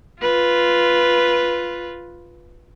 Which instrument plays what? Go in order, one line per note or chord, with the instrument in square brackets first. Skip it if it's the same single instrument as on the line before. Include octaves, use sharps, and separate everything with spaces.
[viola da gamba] F4 B4